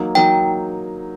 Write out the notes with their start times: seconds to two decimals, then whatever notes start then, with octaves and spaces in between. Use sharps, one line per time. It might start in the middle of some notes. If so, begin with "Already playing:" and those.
Already playing: F#3 A#3 D#4
0.15 F#3 A#3 D#4 G5